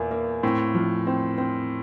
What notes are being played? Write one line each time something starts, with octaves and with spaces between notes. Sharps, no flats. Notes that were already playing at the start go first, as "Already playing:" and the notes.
Already playing: E2 A#2 A#3
A#3
A2 C4
F3
C4
C4